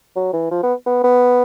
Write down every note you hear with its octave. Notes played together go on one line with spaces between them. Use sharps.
F#3
E3
F3
B3
B3
B3